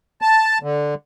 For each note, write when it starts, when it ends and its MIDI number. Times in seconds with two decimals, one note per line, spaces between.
0.22 0.58 81
0.63 0.94 50